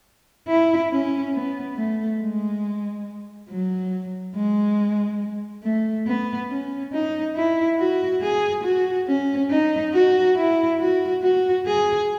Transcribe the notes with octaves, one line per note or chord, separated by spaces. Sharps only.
E4
C#4
B3
A3
G#3
F#3
G#3
A3
B3
C#4
D#4
E4
F#4
G#4
F#4
C#4
D#4
F#4
E4
F#4
F#4
G#4